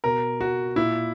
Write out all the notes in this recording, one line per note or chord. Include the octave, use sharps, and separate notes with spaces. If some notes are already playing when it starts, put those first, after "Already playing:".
B2 A#4
F#4
A#2 E4